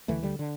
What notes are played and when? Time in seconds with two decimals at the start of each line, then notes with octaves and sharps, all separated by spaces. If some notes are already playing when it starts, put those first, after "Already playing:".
0.08 D2 D3 E3 A3
0.23 D3 G3
0.39 D3